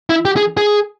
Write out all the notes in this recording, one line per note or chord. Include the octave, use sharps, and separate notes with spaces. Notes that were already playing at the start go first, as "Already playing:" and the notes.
E4
G4
G#4
G#4